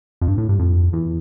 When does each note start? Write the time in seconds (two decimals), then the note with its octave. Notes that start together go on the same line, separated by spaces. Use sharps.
0.21 F2
0.27 G2
0.38 A2
0.49 G2
0.60 F2
0.93 E2